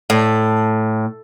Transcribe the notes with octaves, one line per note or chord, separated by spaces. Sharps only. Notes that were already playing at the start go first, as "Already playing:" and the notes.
A2